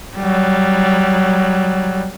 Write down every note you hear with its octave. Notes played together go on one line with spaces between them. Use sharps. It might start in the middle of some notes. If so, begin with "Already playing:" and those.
F#3 G3